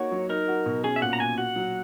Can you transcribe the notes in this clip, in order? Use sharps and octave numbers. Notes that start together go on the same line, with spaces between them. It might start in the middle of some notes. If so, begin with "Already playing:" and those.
Already playing: A#3 D#4 F#4 C#5
F#3
D#4 A#4
F#4
B2
C#4 G#4
E5
A#2 F#5
A#5
A#2 G#5
F#4 F#5
F#3